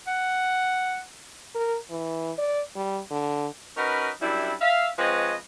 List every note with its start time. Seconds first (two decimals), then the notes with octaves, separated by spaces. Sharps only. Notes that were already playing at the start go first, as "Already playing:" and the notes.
0.07 F#5
1.55 A#4
1.90 E3
2.38 D5
2.76 G3
3.11 D3
3.77 C#4 D#4 F#4 A#4 B4
4.22 F#2 G3 D4 E4
4.61 E5 F5
4.99 F3 G#3 C4 B4 C#5 D#5